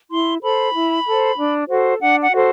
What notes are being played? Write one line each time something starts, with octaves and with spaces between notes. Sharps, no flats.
E4 C6
A4 C5 B5
E4
A4 C5
D4
F#4 A4 C5
D4 F#5
F#5
F#4 A4 C5